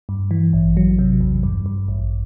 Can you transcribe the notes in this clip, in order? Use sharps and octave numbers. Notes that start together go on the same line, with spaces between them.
G2
E3
A1
F#3
C3
E2
G2
G2
A1